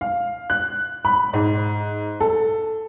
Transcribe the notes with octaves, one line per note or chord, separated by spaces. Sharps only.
F5
F#6
B5
G#2
A4